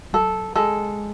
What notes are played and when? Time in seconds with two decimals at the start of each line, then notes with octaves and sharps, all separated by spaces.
0.13 F#3 A4
0.55 G#3 A4